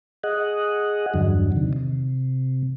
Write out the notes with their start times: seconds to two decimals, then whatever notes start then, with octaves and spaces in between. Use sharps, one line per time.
0.24 G#4 D#5 F#5
1.14 E2 G2 D3 F#3
1.52 C3 D#3
1.73 C3